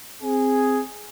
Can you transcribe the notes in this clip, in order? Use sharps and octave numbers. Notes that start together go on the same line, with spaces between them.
C4 G#4